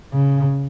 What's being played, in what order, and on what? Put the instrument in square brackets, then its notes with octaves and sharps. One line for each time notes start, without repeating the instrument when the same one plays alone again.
[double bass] C#3